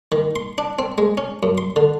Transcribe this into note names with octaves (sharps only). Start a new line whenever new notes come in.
D#3
C6
D4
C4
G#3
C#4
F#2
C6
D3